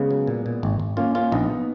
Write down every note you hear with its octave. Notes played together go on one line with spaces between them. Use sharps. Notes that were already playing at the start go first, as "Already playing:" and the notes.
Already playing: C#3 G#3 B3
F#3
A#2
A#2
G#1
G#1
A#3 C#4 F4
A#3 C#4 F4
A#1 B3 D#4
B3 D#4